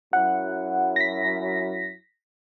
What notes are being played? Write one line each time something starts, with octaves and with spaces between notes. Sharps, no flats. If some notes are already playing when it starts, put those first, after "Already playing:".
F#2 F#3 E4 F#5
A#6 B6